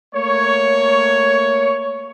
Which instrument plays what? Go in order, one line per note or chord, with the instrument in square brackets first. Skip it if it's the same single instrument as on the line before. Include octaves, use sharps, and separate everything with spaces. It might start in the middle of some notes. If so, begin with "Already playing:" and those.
[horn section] A3 A#3 C#5